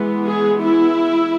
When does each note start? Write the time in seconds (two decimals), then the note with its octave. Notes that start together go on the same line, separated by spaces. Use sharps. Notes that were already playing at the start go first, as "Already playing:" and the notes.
Already playing: E3 G#3 B3
0.28 G#4
0.63 E4